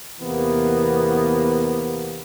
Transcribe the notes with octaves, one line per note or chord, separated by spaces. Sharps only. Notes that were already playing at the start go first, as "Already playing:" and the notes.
E2 C3 E3 A#3 B3